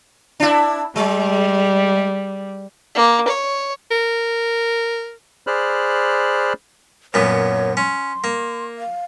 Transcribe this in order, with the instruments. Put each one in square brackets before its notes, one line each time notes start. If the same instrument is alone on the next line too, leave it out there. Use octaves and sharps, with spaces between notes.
[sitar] D4 E4
[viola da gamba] G3 [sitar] G#3
[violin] A#3
C#5
[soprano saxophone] A#4
[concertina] G#4 C5 D5 B5 F6 F#6
[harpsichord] F#2 A#2 B3 [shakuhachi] C#5
[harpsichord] C#4 [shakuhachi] C6
[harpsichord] A#3
[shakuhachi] F5